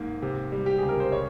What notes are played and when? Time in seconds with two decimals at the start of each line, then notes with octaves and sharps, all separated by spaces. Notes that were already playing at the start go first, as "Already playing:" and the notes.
Already playing: G#2 A#3
0.22 C3
0.52 G3
0.66 G4
0.78 C#2 G#4
0.89 A#4
1.00 C5
1.12 C#3 C#5